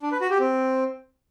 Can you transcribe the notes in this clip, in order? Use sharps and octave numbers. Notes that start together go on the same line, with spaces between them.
D4
B4
F#4
G4
C4